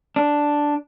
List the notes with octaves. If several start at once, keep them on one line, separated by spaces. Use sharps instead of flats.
D4